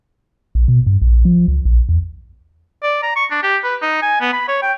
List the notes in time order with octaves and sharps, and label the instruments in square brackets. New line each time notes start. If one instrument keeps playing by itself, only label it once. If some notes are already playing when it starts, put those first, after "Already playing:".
[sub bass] A#1
B2
G2
A#1
F3
C#2
A#1
E2
[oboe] D5
A#5
C#6
D4
G4
B4
D#4
G#5
B3
B5
C#5
G5